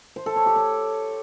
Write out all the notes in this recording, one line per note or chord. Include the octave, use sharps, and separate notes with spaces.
C5
A4
C#5
G4
C#5